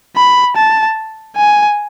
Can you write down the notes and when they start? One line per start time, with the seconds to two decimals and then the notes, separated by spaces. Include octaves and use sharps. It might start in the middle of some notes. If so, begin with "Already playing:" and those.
0.16 B5
0.57 A5
1.36 G#5